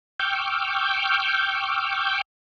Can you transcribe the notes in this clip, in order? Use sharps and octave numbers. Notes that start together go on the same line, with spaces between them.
G5 C#6 D6 E6 F6 G6